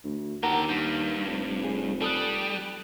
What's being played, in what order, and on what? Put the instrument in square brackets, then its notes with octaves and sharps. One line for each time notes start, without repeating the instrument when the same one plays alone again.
[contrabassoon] D2
[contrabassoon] D#2 [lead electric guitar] G4 A4 [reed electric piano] A#4 F#5 A#5
[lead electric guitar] G2 [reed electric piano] G6
[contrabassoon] F1
[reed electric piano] G#4
[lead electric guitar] G3 [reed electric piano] A4 D#6 F#6